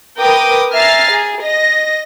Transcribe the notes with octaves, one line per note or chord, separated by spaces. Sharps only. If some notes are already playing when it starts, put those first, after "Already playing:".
A#4 B4 G5 D6 D#6
E5 G#5 A#5 F6 A6 C7
G#4
D#5 A#6